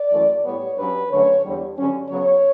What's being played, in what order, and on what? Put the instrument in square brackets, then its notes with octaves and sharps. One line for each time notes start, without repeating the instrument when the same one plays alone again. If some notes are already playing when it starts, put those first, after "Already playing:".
Already playing: [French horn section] D5
F#2 E3 A3
A2 G3 B3 C#5
G2 F#3 C#4 B4
F#2 D3 F#3 A3 C#4 C#5
E2 D3 G3
G2 D3 F#3 C#4
C#3 F#3 B3 C#5